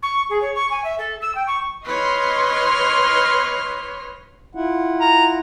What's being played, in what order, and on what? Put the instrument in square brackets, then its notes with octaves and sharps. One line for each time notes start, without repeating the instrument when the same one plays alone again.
[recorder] C#6
G#4
C#5
C#6
G#5
E5
A4
E6
G5
C#6
[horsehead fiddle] B4 C#5 [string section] D#5 C6 F6
[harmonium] E4 F4 F#5
[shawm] A#5